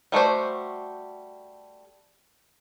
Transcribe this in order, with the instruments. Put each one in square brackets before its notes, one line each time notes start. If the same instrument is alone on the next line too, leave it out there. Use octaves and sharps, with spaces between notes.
[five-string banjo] G3 A3 F#4 C5